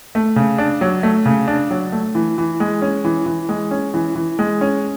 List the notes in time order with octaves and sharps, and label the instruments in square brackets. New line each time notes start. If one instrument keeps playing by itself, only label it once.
[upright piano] A3
C#3
D4
F#3
A3
C#3
D4
F#3
A3
E3
E3
G#3
C#4
E3
E3
G#3
C#4
E3
E3
G#3
C#4